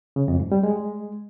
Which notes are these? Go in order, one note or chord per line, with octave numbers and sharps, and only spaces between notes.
C#3
F2
G#2
G3
G#3